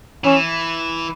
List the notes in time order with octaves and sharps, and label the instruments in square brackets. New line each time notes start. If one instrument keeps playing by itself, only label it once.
[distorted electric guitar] E3 [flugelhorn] C#4